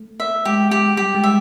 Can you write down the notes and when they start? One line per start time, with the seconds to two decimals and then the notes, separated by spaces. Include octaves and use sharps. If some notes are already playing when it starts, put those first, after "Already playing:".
Already playing: A3
0.20 E5
0.45 G#3 G4
0.71 G#3 G4
0.97 G3 G4
1.15 G#3
1.24 E5